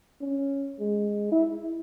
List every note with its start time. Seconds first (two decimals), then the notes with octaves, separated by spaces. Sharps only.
0.21 C#4
0.79 G#3
1.32 E4